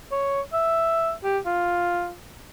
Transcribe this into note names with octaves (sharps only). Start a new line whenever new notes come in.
C#5
E5
G4
F4